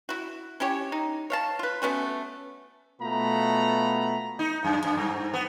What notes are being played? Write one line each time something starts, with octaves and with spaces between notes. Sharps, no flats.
E4 F#4
C#4 E4 G4 C#5
D#4
C#5 F5 A5
F4 B4
A3 B3 C#4 F#4
B2 A3 B3 F4 A#5 B5
D#4
F#2
F#2
G2
B3